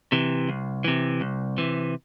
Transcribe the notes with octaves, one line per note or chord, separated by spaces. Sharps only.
C3 E3
C2
C3 E3
C2
C3 E3